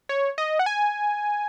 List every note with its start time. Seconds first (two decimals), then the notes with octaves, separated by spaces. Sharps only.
0.09 C#5
0.38 D#5
0.59 F#5
0.66 G#5